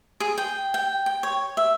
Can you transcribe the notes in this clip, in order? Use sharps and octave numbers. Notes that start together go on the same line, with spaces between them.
G#4
G5
G5
G5
C#5
E5